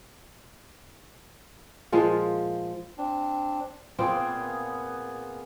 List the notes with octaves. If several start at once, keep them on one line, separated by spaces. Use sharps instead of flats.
A#2 F3 G#3 F4
C4 D4
A#2 B3 C4 F4 G#4 D5